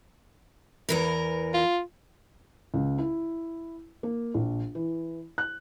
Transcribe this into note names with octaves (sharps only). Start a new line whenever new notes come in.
E2 E3 A#4
F4
C#2
E4
A#3
A#1
E3
F#6